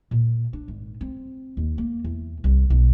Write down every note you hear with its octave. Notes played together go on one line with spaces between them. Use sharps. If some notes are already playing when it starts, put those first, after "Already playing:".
A#2
D4
G#1
C4
D#2
A#3
E2
C2
B1